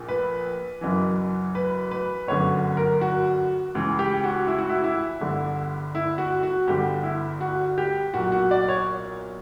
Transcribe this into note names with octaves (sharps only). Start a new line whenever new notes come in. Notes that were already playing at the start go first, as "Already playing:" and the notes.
Already playing: A#1 A#2
B4
F#1 F#2 E3
B4
B4
G1 F#2 D3 C#5
A#4
F#4
C#2 C#3 E3
G4
F#4
E4
F#4
E4
E4
G1 G2 D3
E4
F#4
F#4
G1 G2 D3 G4
E4
F#4
G4
B1 A#2 F#4
F#4
D5
C#5